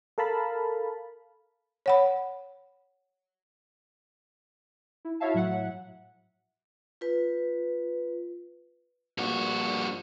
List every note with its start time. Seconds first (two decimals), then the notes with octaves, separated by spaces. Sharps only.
0.18 A4 A#4 F5 A5 B5
1.86 C#5 F#5 B5
5.05 E4
5.20 E4 F#4 C#5 E5 F5 A5
5.34 A2 F#3 E5 F#5
7.01 F4 B4
9.18 A#1 G2 F#4